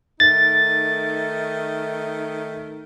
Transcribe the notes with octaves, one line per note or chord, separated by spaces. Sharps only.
D#3 A3 D#4 A6